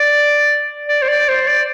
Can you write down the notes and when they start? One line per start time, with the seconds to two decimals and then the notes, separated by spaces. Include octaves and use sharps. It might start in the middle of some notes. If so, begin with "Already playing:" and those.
Already playing: D5
0.88 D5
1.02 C5
1.08 D5
1.29 C5
1.47 D5